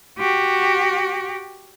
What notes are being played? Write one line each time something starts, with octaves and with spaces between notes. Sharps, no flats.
F#4 G4